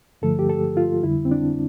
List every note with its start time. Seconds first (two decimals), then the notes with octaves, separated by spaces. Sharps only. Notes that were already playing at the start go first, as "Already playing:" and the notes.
0.22 G2 D3 F3 A3 A4
0.39 G4
0.49 A4
0.77 F4
1.03 F2 D3 G3 E4
1.25 C4
1.31 D4